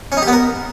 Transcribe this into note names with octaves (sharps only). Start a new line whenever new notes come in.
C#4
D#4
G4
B3
A#4